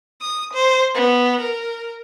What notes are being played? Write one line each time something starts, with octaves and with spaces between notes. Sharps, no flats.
D#6
C5
B3
A#4